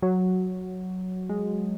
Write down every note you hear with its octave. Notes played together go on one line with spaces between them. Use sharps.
F#3
G#3